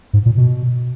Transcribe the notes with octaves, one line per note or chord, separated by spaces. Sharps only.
G#2
A#2
B2